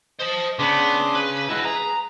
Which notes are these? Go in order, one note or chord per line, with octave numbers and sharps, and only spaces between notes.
C5 D#5 A5
C#3 B3 D4 C6 D6
B4
G#3 E4 F#4 E5
G#4 A#5